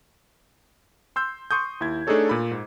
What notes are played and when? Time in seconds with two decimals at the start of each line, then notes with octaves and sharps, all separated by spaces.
1.16 C6 E6 G6
1.51 C6 C#6 D#6 G6
1.81 D#2 E4 G#6
2.07 A3 D4 D#4 G#4 A4 C#5
2.29 A#2 B5
2.51 G#2